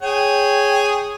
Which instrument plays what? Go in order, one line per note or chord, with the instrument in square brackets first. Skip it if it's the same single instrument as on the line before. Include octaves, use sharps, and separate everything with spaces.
[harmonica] G#4 C#5 G5